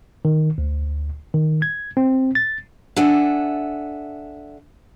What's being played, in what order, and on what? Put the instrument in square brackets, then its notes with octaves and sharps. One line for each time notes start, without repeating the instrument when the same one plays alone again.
[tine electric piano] D#3
D2
D#3
G#6
C4
A6
[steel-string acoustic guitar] D4 A4 E5 F#5 G#5